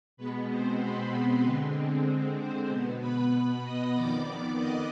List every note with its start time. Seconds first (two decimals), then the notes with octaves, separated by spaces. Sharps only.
0.17 B2 G#3 B3 B4
0.48 C4 C5
0.80 B4
1.12 B4
1.43 D3 G#3 C4
2.37 C4 C5
2.69 B2 B3
3.00 B4 B5
3.63 D#5 D#6
3.94 F2 D#3 B3 D5 D6
4.57 D#5 D#6